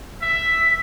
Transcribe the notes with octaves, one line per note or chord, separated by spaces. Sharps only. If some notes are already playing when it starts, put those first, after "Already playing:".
E5 B6